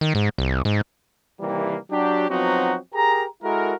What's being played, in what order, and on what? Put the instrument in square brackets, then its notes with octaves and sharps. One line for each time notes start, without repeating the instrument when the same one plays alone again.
[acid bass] D#3
G#2
C2
G#2
[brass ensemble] C3 D#3 E3 G3 A#3
F#3 D4 G4
F3 F#3 B3 C4 D#4 F#4
G4 G#4 A#4 A#5
G#3 E4 F#4 A4 A#4